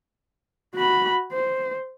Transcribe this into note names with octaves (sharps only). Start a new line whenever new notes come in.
F#4 B5
C5